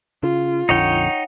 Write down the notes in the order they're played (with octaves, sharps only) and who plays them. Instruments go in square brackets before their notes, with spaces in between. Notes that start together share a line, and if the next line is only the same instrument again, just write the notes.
[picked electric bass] C#3 [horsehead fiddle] F4
[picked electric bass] A#1 F2 D3 [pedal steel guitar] D#4 C#5 G5 [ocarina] F#5